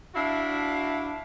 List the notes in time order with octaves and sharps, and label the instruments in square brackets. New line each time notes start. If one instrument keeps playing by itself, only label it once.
[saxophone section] D4 E4 F#4 E5 F5